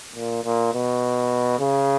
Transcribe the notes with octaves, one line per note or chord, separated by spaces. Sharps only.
A#2
A#2
B2
C#3